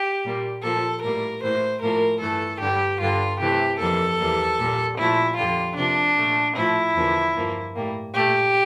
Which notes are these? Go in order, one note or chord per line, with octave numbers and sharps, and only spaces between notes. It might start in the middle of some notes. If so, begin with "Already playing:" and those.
Already playing: G4
A#2 G3 A#3
A#2 F3 A#3 A4
A2 G3 A#3 A#4
A2 E3 A#3 C5
A2 F3 A#3 A#4
G2 E3 A3 A4
G2 D3 G3 G4
G2 D3 G3 F4
C3 E3 A3 G4
F2 E3 G3 A#3 A4
E2 E3 G3 A#3
A#2 G3 A#3
A#2 F3 A3 E4
F2 D3 G3 F4
C3 F3 A#3 D4
A#2 A3
A2 F3 A3 E4
E2 D3 F3 A#3
G2 F3 A#3
A2 G3 A#3
A#2 A3 G4